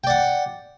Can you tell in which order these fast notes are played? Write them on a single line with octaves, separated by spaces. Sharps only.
G5 D5 F#5